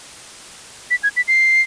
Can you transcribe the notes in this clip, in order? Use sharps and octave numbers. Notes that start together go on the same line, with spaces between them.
B6
G#6
B6
C7